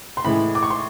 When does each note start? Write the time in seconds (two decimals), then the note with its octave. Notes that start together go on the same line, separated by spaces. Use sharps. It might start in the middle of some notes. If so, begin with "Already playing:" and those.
0.17 C6
0.24 A2 E3 G#3 B5
0.55 D6
0.63 C#6
0.70 C6